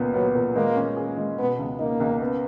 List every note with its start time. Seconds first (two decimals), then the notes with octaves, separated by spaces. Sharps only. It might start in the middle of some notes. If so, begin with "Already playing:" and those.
Already playing: C#2 A#2 B3
0.14 F#3 B3
0.35 A#2
0.55 G#3 A#3
0.76 C#4
0.97 G#4
1.18 G#3
1.38 B2 B3
1.59 C#2
1.79 A#3 D#4
2.00 C#2
2.20 B3